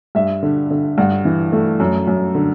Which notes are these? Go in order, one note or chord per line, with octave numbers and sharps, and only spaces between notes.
G2 E5
D3
D3
G2 F#5
E3
A3
F#2
F#2
D3